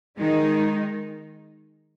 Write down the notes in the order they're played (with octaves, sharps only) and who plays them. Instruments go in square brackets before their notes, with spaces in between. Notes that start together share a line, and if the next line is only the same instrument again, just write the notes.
[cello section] D#3 G#3 D#4